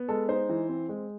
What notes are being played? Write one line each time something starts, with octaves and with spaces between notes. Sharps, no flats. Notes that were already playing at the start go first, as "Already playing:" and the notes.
Already playing: B3
G#3 A4
D#4 C5
E3
C4
G#3